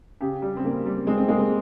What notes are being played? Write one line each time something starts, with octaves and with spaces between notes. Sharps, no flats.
C#3 G4
G3
C4
C#3 A#3
G3
G#3 C4
C4
G#3 A#3
C4